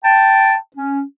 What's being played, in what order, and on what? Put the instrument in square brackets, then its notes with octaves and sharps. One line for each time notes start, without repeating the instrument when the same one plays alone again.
[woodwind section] G5 A5
C#4